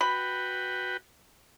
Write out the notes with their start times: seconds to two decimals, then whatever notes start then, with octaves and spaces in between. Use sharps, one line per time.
0.01 F#4 B4 G5 B5